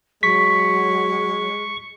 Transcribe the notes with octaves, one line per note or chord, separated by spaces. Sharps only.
F#3 G#3 C#6 B6